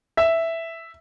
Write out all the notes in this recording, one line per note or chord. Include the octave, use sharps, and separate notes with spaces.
E5